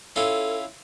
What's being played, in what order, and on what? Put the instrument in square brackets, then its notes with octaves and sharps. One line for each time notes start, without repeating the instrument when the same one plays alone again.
[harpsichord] C#4 E4 F4 [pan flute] A4